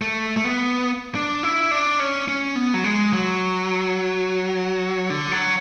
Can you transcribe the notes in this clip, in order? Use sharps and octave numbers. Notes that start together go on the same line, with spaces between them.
A3
A3
B3
D4
E4
D4
C#4
C#4
B3
F#3
G#3
F#3
D3
F#3